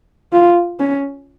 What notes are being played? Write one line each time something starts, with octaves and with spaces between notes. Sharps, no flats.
F4
C#4